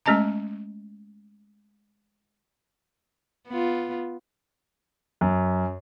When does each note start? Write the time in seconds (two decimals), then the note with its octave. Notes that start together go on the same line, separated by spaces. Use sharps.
0.06 G#3 A3 C#4 D#5 A5 A#5
3.48 B3 F4
5.21 F#2